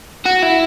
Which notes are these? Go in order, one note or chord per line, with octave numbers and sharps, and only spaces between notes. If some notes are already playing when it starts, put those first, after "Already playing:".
F#4
E4